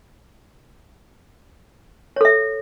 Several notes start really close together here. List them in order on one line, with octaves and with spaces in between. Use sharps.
C#5 A4 E5